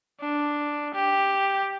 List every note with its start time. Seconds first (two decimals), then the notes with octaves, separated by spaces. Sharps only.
0.21 D4
0.95 G4